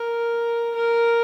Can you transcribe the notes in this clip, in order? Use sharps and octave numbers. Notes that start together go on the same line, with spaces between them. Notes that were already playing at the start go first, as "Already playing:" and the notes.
Already playing: A#4
A#4